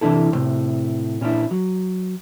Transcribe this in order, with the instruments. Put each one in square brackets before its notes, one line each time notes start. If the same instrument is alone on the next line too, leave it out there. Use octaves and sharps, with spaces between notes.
[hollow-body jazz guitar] C3 E3 D4 E4 A4
E2 A2 C3
A#2 C#4 D4 E4
F#3